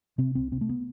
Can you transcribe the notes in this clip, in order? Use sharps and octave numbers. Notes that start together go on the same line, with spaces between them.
C3 C4
C2 C4
C3 C4
A3
B3